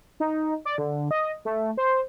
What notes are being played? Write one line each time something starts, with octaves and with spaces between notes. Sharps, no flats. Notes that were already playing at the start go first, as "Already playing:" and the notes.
D#4
D5
D3
D#5
A3
C5